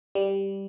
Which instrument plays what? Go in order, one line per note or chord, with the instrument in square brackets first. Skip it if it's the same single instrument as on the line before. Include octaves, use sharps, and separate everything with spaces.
[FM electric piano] G3